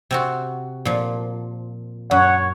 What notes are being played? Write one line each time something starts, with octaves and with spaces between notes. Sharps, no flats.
C3 C4 F#4
A#2 F3
F#2 C#5 F#5